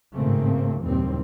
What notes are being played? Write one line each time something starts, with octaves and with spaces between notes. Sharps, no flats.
G#1 A2 C#3 A3 A#3 C4
F#1 D#2 A#2 E3 G3 C4